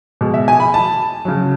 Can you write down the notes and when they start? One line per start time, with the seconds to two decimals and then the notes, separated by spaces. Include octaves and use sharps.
0.21 B2 G#3
0.34 E5
0.48 G#5
0.60 B5
0.74 A5
1.25 C#3 F#3